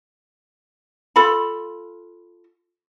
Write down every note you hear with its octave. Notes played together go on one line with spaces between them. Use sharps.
F4 A4 B5